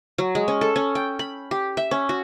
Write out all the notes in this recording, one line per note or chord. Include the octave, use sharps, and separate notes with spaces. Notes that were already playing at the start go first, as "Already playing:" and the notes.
F#3
G#3
C#4
A4
C#4
G5
B5
G4
E5
C#4
F#4